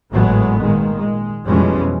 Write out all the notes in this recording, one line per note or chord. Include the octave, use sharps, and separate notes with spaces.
G#1 A2 F#3 G#3 A3 B3
A#2 D#3 G#3
G#3
F2 B2 E3 G3 G#3 C#4